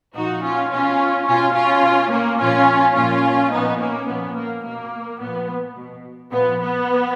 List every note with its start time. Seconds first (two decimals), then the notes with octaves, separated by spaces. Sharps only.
0.15 A#2 F3 D#4 F#4
0.43 C#4 F4
0.71 B2 C#4 F4
1.27 B2 C#4 F4
1.55 C#4 F4
1.84 B2
2.11 A#3 C#4
2.39 A#2 F3 C#4 F4
2.95 A#2 F3 C#4 F4
3.51 A#2 F3 B3 D#4
3.79 A#3 C#4
4.07 A#2 F3 B3
4.36 A#3
4.64 B2 A#3
5.20 A#2 F3 B3
5.76 B2
6.32 A#2 F3 B3
6.60 B3